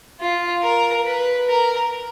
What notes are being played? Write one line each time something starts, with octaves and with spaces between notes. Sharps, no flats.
F4
A#4
B4
A#4